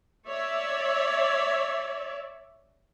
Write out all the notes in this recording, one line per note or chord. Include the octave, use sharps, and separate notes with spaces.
C#5 D5 E5